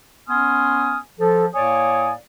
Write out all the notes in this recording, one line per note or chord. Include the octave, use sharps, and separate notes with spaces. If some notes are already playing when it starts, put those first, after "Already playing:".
B3 C#4 G#5 C6 D#6 F6
F3 A4
A2 A#3 C#5 D5 G#5 D#6